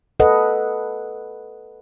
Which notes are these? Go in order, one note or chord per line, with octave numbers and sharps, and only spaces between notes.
A4 B4 D#5 F#5